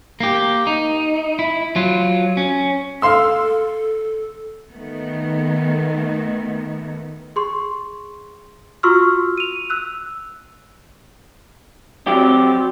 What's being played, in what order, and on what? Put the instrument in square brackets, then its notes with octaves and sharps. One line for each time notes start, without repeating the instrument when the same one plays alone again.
[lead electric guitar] A#3 G4
D#4
E4
F#3 F4
C#4
[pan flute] A4 [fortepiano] F5 C6 E6
[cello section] D#3 A3 B3
[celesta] G#4 C6 C#6
F4 F#4 C6 C#6 E6 F6
D#7 F7
E6 F#6
[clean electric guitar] F#3 G4 [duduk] C4